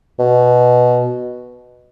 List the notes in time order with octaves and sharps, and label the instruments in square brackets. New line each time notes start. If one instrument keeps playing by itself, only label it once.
[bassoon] B2